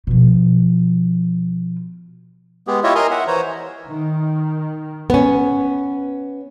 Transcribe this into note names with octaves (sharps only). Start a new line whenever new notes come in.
B2 F3
G#3 B3 G4 G#4
E4 F4 G4 C#5 D#5 E5
A#4 D#5 G#5 A#5 C6
E5 F#5
E3 C5 C#5 A#5
D#3
B3 C#4